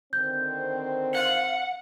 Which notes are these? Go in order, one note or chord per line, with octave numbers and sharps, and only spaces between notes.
D3 D#3 C4 G6
F5 F#5